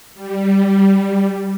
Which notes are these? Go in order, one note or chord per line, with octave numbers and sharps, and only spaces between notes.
G3